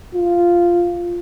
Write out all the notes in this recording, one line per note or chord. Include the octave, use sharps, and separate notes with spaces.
F4